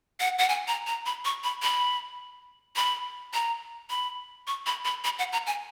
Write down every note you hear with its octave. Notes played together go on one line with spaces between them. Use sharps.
F#5
F#5
G#5
A#5
A#5
B5
C#6
B5
B5
B5
A#5
B5
C#6
B5
B5
B5
F#5
A#5
G#5